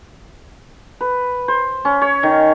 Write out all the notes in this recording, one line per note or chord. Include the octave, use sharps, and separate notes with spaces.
B4
C5
C#4
C#5
D#3